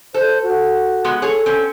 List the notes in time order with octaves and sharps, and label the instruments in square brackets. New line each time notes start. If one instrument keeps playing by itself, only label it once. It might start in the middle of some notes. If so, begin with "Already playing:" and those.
[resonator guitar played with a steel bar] A4 [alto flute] C5
[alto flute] F#4
[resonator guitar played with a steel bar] G#3 B3
[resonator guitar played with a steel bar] G#4 C#5 [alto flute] A4
[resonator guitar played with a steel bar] C4 C#4